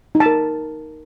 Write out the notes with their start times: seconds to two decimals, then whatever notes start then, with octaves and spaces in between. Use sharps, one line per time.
0.15 D#4
0.20 A5
0.26 A#4